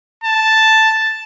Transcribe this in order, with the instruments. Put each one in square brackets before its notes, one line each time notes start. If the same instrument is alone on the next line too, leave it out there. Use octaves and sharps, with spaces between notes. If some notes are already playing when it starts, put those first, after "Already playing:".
[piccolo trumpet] A5